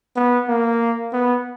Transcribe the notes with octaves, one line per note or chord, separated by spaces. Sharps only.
B3
A#3
B3